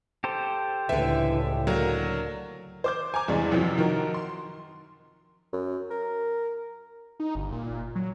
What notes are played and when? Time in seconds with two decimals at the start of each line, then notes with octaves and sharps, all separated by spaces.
0.24 G4 A4 C5
0.89 C#2 A2 D3 E3 E5
1.67 D3 F#3 A#3 A#4
2.84 C5 D6 G6
3.14 G#5 A#5 D6
3.28 E2 G2 C3 E3 G#3 D5
3.51 A1 F#2 C3 F3
3.78 D#3 F3 F#4 A#4
4.14 C6
5.53 F#2
5.90 A#4
7.20 D#4
7.35 G1
7.52 A#2
7.95 F#3